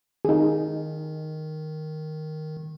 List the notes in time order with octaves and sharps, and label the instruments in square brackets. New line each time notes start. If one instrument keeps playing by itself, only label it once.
[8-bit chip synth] D#3 [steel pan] D#4 G#4